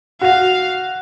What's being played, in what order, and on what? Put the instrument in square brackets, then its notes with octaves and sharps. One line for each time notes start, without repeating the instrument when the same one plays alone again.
[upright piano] F#4 [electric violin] F5